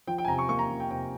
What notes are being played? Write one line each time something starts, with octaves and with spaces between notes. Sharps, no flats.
F3 G5
G5
G#5
C3 A#5
C#6
A#3 C#6
A#5
F3
G5
C3 G5